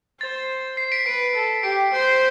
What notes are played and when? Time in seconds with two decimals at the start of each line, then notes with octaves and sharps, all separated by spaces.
0.21 C5 A6
0.77 C7
0.92 B6 D7
1.06 B4 B6 D7
1.35 A4
1.63 G4 B6 D7
1.92 C5